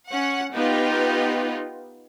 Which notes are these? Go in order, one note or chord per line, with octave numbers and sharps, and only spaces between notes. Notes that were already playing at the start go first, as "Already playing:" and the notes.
C#4 F#5
B3 D#4 F4 G4